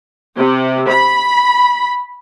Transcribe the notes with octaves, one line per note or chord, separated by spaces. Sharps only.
C3
B5